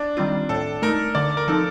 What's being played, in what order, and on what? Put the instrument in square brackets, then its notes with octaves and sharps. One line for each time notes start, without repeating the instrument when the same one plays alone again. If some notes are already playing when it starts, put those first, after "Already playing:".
Already playing: [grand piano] D4
[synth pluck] D#3 G3 C4 F4
[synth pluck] A2 [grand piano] A4
[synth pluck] A3 D#4 [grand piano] A#4
[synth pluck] D3 [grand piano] D5
[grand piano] A#4
[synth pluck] F3 C4 D#4 [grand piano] A4